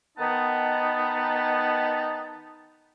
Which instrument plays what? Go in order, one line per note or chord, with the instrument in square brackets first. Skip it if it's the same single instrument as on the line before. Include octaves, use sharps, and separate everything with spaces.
[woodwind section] D#3 B3 D#4 A5